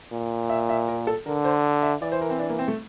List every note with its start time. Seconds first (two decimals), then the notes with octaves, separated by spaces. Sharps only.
0.12 A#2
0.50 E5
0.69 E5
0.88 A#4
1.07 A4
1.26 D3 A#4
1.45 C5
1.83 E5
2.02 E3 D5
2.12 C5
2.21 A#4
2.30 C4
2.39 D4
2.49 A#3
2.59 C4
2.68 A3